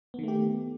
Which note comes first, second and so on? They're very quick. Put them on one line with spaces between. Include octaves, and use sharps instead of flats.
B3 D#3 A3 G4